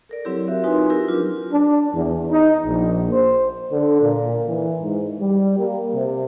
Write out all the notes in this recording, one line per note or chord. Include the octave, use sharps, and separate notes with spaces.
A4 A#4 D5
F#3 C4 E4 G4 C#5
C4 F#4 A#4 E5 F5
D#4 F4 F#4 B4 G#5 C6
C4 E4 G4 A#4
F#3 D4 F4
D4
E2
D#4
A#1
C5
D3
A#2
E3
G#2
G3
A#3
C3